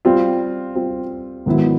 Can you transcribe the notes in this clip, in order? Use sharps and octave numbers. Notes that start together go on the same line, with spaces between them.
G3 C4 F4
G3 C4 F4
G#2 D#3 F#3 B3 E4